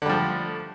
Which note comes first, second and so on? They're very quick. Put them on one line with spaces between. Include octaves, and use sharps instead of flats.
D3 G3 F3 A3